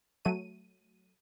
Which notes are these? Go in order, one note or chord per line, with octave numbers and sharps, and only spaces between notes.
F#3 A3 D#7